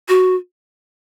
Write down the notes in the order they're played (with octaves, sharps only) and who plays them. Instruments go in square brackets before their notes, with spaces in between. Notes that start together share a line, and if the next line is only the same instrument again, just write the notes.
[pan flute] F#4